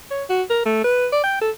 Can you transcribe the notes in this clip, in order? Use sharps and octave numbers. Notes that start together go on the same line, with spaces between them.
C#5
F#4
A#4
A3
B4
D5
G5
A4